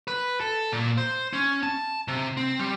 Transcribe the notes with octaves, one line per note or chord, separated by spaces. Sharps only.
B4
A4
A#2
C5
C#4
A5
C3
C4
G3